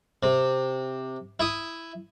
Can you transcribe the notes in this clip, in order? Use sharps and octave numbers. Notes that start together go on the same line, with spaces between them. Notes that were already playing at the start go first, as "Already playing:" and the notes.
C3
E4 D#6